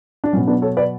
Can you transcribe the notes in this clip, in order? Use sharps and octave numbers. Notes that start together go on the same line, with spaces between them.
D4
B2 F#3 C#4
B3 D4
A4 C#5
B4 D5